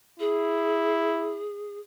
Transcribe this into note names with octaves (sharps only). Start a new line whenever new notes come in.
E4 G#4